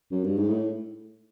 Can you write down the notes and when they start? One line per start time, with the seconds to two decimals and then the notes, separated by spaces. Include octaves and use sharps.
0.11 F#2
0.24 G2
0.37 G#2
0.49 A2